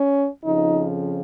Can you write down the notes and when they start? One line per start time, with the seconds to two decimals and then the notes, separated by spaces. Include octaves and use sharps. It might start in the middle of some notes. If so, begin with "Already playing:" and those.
Already playing: C#4
0.43 F2 C#3 F3 D#4